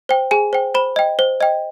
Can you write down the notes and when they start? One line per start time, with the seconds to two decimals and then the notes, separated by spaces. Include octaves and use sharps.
0.09 C5 G5
0.31 G#4 G#5
0.53 C5 G5
0.75 C5 B5
0.96 D#5 G5
1.19 C5
1.41 D#5 G5